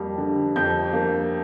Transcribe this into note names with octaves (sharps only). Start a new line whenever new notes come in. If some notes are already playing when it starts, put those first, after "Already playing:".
Already playing: F2 G3 A#3
D3
F2 G6
A#3